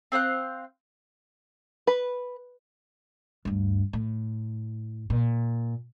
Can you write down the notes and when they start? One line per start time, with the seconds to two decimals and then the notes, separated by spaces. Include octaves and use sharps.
0.12 C4 C5 F5 F#6
1.87 B4
3.45 D2 G2
3.93 A2
5.10 A#2